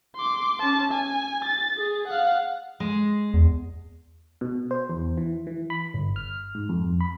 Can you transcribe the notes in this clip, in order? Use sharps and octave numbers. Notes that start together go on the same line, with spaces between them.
C6 D6
C#4 A5
G#5
A6
G#4
F5 F#5
G#3
E2
B2
C5
E2
E3
E3
B5
G1
F6
G#2
F2
B5